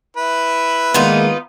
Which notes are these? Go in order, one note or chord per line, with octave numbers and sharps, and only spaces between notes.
E4 B4
D#3 G#3 A#3 B3 D#4 F4